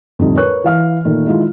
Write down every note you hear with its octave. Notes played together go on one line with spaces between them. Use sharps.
F2 A2 D3 G3 A3 D#4
A#4 B4 C#5 C#6 F#6
E3 F5 F6
A#2 D#3 A3
D#3 G#3 E4 F4